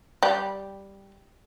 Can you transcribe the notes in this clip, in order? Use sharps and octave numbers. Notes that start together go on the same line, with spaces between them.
G3